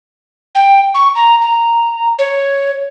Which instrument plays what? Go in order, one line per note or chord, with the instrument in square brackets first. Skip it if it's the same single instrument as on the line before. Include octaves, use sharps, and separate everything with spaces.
[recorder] G5
C#6
A#5
A#5
C#5